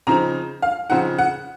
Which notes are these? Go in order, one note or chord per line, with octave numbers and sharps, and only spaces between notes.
C#3 F3 C4 D#4 A#5
F5
C#3 F3 C4 D#4 F#5
F#5